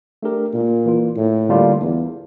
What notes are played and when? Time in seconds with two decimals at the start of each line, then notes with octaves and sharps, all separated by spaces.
0.23 A3 D4 G4 A#4
0.54 A#2
0.86 E3 A#3 F4
1.17 A2
1.49 D3 G3 A#3 D4 F4
1.81 E2